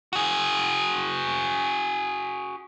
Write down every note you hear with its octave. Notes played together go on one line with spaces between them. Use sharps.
F#4 G#4